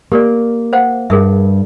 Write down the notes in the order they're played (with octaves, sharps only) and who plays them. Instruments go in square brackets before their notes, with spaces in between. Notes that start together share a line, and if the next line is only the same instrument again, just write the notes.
[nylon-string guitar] A#3 [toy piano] G4 A#4 D5
[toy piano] C5 F5 F#5
[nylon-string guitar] G2 [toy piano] G#4 A#4 E5